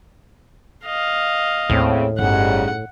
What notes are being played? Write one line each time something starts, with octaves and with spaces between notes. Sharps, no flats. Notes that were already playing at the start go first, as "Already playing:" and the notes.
D#5 F5
D#2 A2 C#3 C4 E4
G1 G#2 C#3 G3 F#5